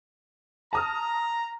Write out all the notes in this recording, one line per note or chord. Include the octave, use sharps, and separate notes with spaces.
A5 A#5 D#6 F6